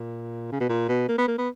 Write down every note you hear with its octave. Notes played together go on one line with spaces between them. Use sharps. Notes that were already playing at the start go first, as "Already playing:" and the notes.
Already playing: A#2
C#3
B2
A#2
B2
A#3
B3
A#3
B3